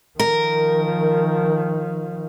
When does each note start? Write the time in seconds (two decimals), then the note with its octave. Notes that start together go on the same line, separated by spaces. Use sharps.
0.20 D#3 F3 A#4